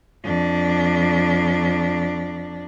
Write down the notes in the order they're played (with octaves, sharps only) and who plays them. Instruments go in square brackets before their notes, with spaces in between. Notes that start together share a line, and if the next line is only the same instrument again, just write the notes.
[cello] F2 D4